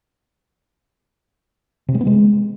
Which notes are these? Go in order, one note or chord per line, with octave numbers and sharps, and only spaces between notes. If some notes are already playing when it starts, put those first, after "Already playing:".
C3
G#3
B3
G#3